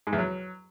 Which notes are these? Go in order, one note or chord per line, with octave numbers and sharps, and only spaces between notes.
G#2
E2
F#3